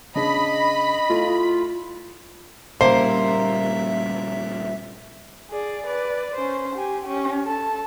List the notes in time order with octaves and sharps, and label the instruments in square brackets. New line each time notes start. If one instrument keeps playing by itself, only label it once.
[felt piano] C#3 D4 G#4 [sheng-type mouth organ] D#5 [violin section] B5
[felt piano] A3 E4 [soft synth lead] F4
[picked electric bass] A#2 C#3 G3 [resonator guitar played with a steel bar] A#3 [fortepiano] C5 [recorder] E5
[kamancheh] G#4 D5
B4 D5
C#4 C5
G4 G#5
C#4 G4
A4 A5